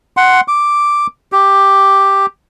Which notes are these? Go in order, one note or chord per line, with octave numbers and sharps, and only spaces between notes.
F#5 C6
D6
G4